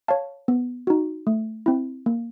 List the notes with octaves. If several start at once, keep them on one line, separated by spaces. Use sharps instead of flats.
C#5 F5 A5
B3
D#4 F#4
A3
C4 E4
A#3